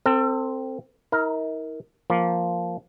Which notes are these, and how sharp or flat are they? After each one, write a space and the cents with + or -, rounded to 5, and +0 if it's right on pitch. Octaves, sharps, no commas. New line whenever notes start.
C4 +0 A4 +35
D#4 +45 A#4 +0
F3 +0 A#3 +0